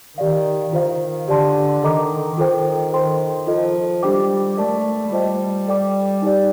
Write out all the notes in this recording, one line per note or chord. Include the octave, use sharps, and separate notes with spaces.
D#3 G4 D5 F5
D#3 F4 C5 F5
D3 G4 D5 A5 C6
D#3 D4 A4 D#5 A#5 D6
D#3 F4 A4 C5 G5
A4 C5 G5 C6
F3 F4 A4 D#5
G3 D4 G4 C5 G5 D6
A3 A#4 D5 A5 D6
G3 F4 C5 D#5 A5
A4 D5 G5 D6
D#4 G4 D5